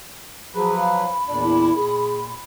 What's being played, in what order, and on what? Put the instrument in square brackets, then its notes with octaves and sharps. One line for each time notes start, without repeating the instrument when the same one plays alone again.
[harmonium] F3 F#3 B4 [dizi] G#4 [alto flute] B5
[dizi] F5
[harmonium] E2 A#2 D4 [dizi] D5
[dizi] E4
[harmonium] A#2 [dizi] G#4